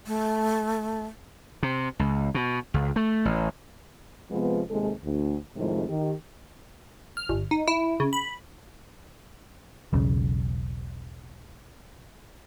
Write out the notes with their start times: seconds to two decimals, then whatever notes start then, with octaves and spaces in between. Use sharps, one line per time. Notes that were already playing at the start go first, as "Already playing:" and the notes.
0.07 A3
1.63 C3
1.99 C#2
2.35 B2
2.74 C#2
2.96 A3
3.25 A1
4.31 C3 F3 G#3 B3
4.69 D#2 C3 G#3 A4
5.04 D2
5.56 F2 A2 C3 D#3 G3 G#3
5.89 D#3 G4
7.17 F6
7.29 G1
7.51 D#4
7.68 E4
8.00 C#3
8.13 B5
9.93 E1 B1 C#3